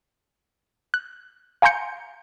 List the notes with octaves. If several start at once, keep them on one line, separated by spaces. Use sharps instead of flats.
F#6
F5 G#5 A#5 C6 G6 C#7